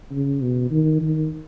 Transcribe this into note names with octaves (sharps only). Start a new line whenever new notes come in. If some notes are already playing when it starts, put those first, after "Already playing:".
C#3
B2
D#3
D#3